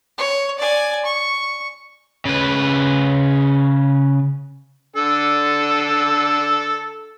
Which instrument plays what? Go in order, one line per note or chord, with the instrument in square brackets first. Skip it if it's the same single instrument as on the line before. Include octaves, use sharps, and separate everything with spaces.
[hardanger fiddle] C#5
D5 G#5
C#6
[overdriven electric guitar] C#3 B4
[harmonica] D3 A4